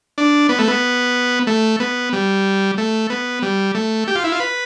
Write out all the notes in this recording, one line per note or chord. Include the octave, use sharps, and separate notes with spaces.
D4
B3
A3
B3
A3
B3
G3
A3
B3
G3
A3
G4
F4
E4
F4
B4